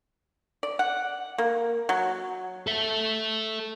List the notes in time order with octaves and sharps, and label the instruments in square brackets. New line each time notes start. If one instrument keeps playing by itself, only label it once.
[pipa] D5
F#5
A#3
F#3
[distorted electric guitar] A4 E5